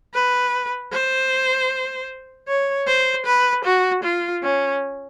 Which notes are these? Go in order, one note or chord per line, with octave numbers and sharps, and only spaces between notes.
B4
C5
C#5
C5
B4
F#4
F4
C#4